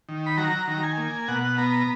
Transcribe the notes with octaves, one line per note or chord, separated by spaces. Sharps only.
D#3
B5
F#3 A#5
D#3
G#5
A#3
B2 F#5
B3 A#5